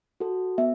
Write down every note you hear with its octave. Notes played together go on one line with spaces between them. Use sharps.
F#4 A4
B3 E5